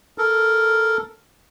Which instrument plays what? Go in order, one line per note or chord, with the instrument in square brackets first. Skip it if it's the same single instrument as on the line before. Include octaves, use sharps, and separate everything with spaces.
[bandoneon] A4 A#4